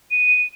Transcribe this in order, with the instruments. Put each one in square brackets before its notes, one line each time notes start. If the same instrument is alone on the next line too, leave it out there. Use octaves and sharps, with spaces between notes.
[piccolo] D#7